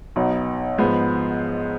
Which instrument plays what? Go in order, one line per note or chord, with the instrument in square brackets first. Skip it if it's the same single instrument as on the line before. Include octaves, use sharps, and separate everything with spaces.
[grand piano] B1 B2 B3 D#4
G#2 F3 G#3 B3